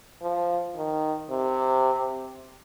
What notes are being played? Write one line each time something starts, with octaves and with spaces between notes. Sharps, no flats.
F3
D#3
C3